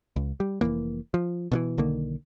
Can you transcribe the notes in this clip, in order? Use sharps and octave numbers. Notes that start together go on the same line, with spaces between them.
C#2
G3
F1 F2 E3 A#3
F3
B2 D#3 E3
B1 D3 D#3 A#3